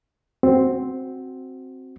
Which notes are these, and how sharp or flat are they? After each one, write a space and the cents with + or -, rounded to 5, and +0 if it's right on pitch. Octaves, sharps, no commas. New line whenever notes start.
C4 +0 F#4 +0